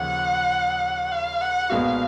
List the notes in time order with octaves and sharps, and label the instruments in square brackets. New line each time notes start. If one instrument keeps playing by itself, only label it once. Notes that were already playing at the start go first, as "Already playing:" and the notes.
Already playing: [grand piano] D#2 C#3 F3 [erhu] F#5
[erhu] F5
F#5
[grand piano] B1 A#2 G#3 B3 F#4 [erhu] F5